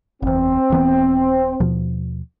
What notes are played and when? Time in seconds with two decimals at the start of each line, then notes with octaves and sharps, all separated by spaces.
0.22 F#1 E2 C4
0.70 D#1 E3 B3
1.60 D#2 B2 F3